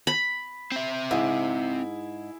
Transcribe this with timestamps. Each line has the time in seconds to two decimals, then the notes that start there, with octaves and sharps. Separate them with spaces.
0.07 B5
0.72 C4 E5
1.11 G#2 E4 G#4